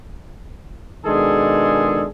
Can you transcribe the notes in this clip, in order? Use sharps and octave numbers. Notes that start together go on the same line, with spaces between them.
B2 D#3 G#3 D4 G#4 A4